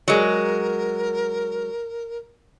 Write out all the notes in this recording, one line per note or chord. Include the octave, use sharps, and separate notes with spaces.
F#3 G#3 A#4